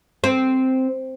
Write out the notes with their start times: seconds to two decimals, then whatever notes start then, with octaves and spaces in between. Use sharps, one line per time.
0.24 C4